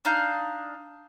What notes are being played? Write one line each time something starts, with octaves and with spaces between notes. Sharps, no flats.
D4 D#4 F5 G6